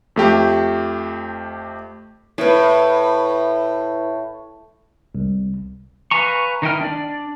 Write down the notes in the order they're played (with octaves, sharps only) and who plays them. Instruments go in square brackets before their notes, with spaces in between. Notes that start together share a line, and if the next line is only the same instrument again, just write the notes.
[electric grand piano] F2 A3 G4
[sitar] A2 [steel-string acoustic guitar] E4 B4
[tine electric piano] C2
[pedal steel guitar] B4 F5 G#5 A#5 C#6
D#3 D#4 E4 G5 F6
D4 D5